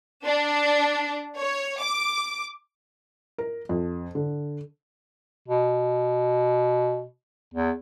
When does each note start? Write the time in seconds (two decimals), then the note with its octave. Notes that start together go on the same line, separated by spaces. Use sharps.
0.24 D4
1.38 C#5
1.81 D6
3.38 A#4
3.69 F2
4.15 D3
5.48 B2
7.54 E2